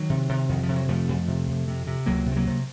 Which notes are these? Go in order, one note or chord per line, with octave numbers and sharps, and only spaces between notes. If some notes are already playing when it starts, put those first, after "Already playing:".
Already playing: D#3 F#3
C3
C3
F2 D#3
F3
C3
F#3
F2 F3 A3
F2
C3
F2
C3
C3
C#2 F#3 A#3
C3
C4
F#3 A#3
C3